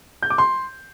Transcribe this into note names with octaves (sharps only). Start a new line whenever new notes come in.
G6
D6
C6